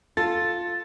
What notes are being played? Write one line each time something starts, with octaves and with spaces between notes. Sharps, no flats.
F4 A4 A6